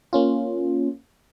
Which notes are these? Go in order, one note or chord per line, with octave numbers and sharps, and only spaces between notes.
A#3 C#4 F4